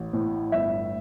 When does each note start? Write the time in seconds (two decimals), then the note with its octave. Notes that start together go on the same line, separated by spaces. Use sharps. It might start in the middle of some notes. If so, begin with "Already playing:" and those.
Already playing: A1
0.13 A2
0.52 G1 E5